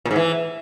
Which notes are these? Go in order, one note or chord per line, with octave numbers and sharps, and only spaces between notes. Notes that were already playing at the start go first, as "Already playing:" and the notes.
A#2
G#2
E3